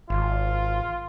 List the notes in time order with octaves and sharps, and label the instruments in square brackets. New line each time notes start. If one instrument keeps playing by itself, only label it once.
[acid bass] G#1 [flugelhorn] F4